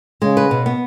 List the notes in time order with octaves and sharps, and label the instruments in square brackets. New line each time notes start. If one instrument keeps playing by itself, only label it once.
[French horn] C#3 [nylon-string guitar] G#3
[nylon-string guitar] B4
B2
B3